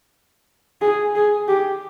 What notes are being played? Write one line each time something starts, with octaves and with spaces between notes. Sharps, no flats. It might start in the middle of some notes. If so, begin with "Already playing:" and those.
G#4
G#4
G4